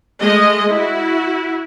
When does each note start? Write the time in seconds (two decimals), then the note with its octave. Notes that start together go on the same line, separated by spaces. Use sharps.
0.21 G#3 A3 D#5
0.69 E4 F#4